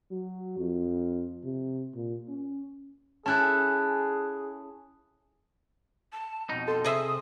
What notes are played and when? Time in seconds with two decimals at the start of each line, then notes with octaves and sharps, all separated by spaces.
0.11 F#3
0.58 F2
1.44 C3
1.95 A#2
2.28 C#4
3.26 C#4 E4 G#4 A4 A5 F#6
6.12 A5
6.49 F2 B2 D#4
6.68 A4 C6
6.84 C3 G#4 C5 D#5 E5 D#6